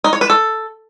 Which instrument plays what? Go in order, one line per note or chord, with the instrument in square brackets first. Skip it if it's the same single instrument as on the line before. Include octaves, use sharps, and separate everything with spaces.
[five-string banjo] D#4
C#5
B4
A4